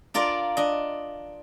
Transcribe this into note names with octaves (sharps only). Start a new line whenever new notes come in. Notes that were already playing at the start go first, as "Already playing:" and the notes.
D4 F4 A#4 D5
D4 D#5